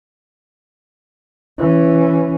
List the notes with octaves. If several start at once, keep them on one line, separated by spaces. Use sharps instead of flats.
E3 C#4